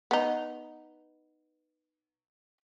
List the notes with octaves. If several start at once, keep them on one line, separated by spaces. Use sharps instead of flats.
B3 D#4